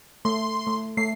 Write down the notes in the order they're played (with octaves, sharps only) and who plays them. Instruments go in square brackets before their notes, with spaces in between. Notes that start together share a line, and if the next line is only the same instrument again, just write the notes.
[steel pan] A3 [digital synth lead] C6
[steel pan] A3
[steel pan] A3 [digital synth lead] C7